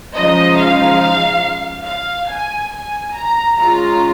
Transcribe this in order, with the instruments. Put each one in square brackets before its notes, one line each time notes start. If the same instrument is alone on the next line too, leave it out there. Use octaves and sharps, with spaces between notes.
[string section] C#3 F3 G#3 D#4 D#5
F5
F5
G#5
G#5
A#5
C#3 G#3 C#4 F4 A#5